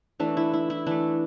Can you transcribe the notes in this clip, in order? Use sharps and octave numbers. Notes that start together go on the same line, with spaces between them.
E3 A3 D4
E4
E4
E4
E3 A3 D4